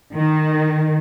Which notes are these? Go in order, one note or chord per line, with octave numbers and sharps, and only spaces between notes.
D#3